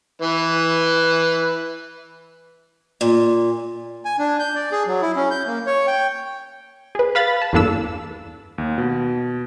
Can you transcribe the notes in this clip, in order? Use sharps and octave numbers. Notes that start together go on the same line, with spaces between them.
E3 B4
A#2
G#5
D4
G6
D5
G#4
F#3
E4
C#4
G6
A#3
C#5
G5
G#4 B4
B4 F5 B5 A6
A5
E2 G2 A#3 D4 A4 E6
D#2
B2